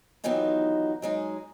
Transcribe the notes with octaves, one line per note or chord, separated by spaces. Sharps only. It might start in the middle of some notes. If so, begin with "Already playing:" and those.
D#3 E3 F#3 B3 D#4 F4
F#3 G#3 D#4